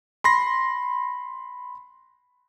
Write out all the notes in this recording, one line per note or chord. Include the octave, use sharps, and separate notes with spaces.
B5 C6 A#6